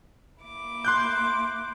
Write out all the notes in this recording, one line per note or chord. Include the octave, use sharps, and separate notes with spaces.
A#3 E4 D6
C6 F#6 G6